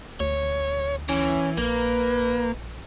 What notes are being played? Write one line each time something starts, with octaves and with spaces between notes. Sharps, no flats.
D2 C#5
E3 C#4
A#1 A#3 B4